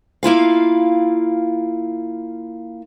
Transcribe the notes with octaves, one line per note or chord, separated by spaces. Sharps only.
A#3 E4 F4 F5